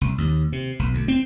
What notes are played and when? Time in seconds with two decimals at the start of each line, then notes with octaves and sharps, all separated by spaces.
0.01 C2
0.18 D#2
0.52 C3
0.79 B1
0.93 D2
1.08 C4